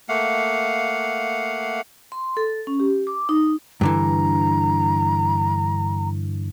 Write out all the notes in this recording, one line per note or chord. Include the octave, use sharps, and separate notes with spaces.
A3 A#3 F5 F#5
C6
A4
C#4
G4
D6
D#4
G2 D3 E3 A#5